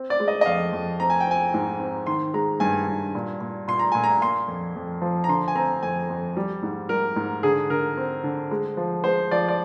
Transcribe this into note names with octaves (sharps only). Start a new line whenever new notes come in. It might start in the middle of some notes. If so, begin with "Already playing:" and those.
Already playing: C4
D5
G#3
D#5
D#5
F2 F5
F2
C4 A#5
G#5
G5
C4 G#5
G#2
C4
D#3 C6
G#3 A#5
G2 G#5
G2
A#2
A#2
A#2 C6
A#5
A#2 G#5
A#5
A#3 C6
F2
F2
F3
A#5
D3 C6
G#5
C4 A#5
F2 G#5
F2
G3
G#2
G3 A#4
G#2
D3 G#4
D3 A#4
C4
D3
G#3
F3
G#3 C5
F3 D5
D5